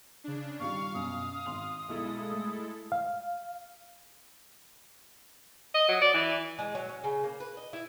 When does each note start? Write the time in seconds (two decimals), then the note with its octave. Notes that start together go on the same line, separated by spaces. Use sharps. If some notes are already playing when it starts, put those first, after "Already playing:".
0.24 C#3 D4
0.60 D#3 G3 F4 F5 C#6
0.94 F#2 B2 D#6
1.46 G#1 C6 F7
1.89 B1 G#3 E4 A4
2.31 A3
2.92 F5
5.74 D#5
5.89 F#3
6.02 D5
6.14 E3
6.59 G#3
6.75 F#3
6.89 C#4
7.04 C#3
7.23 A#3
7.40 B4
7.57 D#5
7.73 E4